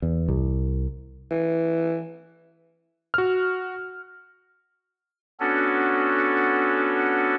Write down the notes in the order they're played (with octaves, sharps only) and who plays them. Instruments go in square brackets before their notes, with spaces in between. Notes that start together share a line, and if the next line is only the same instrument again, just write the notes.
[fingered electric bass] E2
C2
[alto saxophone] E3
[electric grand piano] F#4 F6
[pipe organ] B3 C#4 D4 F#4 A4